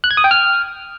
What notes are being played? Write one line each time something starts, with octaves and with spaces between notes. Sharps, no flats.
F#6
G#6
D#6
G5
F6